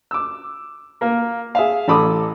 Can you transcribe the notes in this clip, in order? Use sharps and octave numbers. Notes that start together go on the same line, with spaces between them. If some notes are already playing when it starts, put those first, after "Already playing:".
D6 E6
A#3 A#4
G#4 E5 F5
A1 A4 B5 D6 D#6